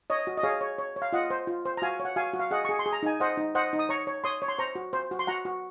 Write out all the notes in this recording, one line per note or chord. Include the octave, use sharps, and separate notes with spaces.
C#5 D#5
F#4
D#5
G#4 C#5 F5
C#5
C#5
C#5
F5
F4 D#5 F#5
C5
F4
C5
A#5
F#4 F5 G#5
C#5
F#5
F#4 F5 G#5
F#4
F5
G#4 D#5 F#5
G#4 C#6
C6
G#4
A#5
D#4 G#5
C5 D#5 F#5
D#4
C5 D#5 F#5
D#4
D#6
C#5 A#5 C#6
C#5
C#5 C6 D#6
C#5
C6
C5 A#5 C#6
F#4
C5
F#4
C6
F#4 F#5 A#5
F#4